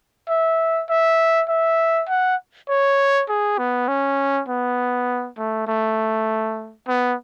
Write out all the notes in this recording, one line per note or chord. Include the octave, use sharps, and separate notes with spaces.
E5
E5
E5
F#5
C#5
G#4
B3
C#4
B3
A3
A3
B3